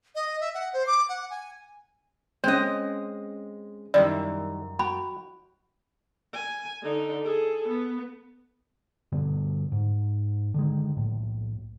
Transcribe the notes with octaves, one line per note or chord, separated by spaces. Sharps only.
D#5
E5
F#5
C5
D6
F#5
G#5
G#3 C4 C#4 C#5 D#5
F#2 D#3 G3 E4 D5
F#4 G5 B5
G#5
D3 D#4
G#4 A4
B3
G2 B2 D3
G#2
D3 D#3 G#3
B1 A2